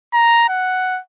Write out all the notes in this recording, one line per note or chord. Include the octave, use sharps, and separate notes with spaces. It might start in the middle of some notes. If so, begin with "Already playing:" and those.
A#5
F#5